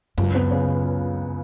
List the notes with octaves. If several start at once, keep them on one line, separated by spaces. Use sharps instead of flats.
C#2 F#2
B3
C#3